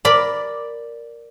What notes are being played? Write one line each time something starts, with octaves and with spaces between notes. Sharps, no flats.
A#4 D5 B5